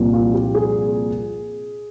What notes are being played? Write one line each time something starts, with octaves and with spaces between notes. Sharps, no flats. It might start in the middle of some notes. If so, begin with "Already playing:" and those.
Already playing: C2 A#2 F3
F4
G4
G#4